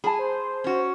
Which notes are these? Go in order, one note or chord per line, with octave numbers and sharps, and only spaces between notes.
G#4 G#5 A5 B5
C5
C#4 F#4